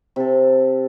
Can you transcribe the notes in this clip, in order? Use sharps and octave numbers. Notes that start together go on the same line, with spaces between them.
C3 A4